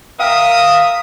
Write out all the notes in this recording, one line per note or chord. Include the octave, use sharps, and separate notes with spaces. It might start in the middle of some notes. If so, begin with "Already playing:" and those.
A#4 E5 F5 G5 D#6